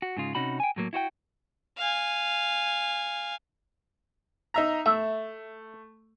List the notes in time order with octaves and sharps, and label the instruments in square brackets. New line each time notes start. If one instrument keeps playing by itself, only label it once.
[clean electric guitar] F#4
G#2 C#3 F4
C3 C#4 D#4 F#4 B5
G5 G#5
A2 F#3 A#3
E4 F#4 C5 G5
[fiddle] F5 G#5
[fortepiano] D#4 E5 A#5
[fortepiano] A3 [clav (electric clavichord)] E5